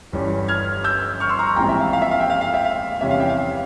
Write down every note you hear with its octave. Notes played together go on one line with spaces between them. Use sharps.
G1 G2 E3 G3 C#4
F6 G#6
E6 G6
C#6 F6
C6 E6
A#5 C#6
A#1 G#2 E3 G3 C4 G5 A#5
E5 G5
F5
F5
E5
F5
E5 G5
F5
F5
E5 G5
F5
E2 C3 G3 C#4 E4 E5
F5
E5 G5
F5